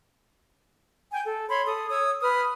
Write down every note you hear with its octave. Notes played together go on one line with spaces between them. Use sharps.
G5 G#5 G6
A4
C#5 B5 C6
A4 D#6
C#5 D#6 E6
B4 B5 D#6 F6